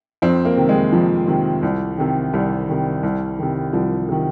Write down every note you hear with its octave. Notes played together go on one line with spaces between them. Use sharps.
F2 C4
A#3
C3 D#3
G#3
F2 F3
C3 D#3
C2
C3 D#3
C2 G3
C3 D#3
C2
C3 D#3
C2 F3
C3 D#3